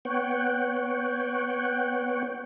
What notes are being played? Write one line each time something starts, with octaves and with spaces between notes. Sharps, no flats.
B3 C#5 F#5 G5